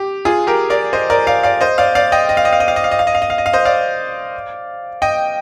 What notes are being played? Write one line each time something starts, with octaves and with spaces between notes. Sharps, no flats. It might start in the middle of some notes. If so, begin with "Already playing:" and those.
Already playing: G4
F4 G#4
G4 A#4
A#4 D5
C5 D#5
A#4 D5
D5 F5
D5 F5
C5 D#5
D5 F5
D5 F5
D#5 G5
D#5
F5
D#5
F5
D#5
F5
D#5
F5
D#5
F5
D#5
F5
D#5
F5
D#5
F5
C5 D#5
D5 F5
D#5 G5